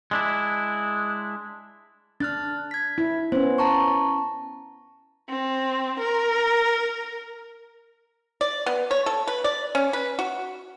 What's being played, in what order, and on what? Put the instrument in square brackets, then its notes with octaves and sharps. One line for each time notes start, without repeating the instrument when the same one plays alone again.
[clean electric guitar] G#3 D4 E4
[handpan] D4 [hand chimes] F6 F#6 A6
[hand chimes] G#6 B6
[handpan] E4
[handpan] B3 C#4 [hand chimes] C5
[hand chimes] A5 A#5 C#6
[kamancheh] C4
A#4
[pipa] D5
B3
C#5
A4
B4
D5
C#4
B4
F#4